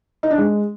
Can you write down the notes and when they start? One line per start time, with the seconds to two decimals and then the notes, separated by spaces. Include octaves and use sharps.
0.23 D#4
0.31 D4
0.38 G#3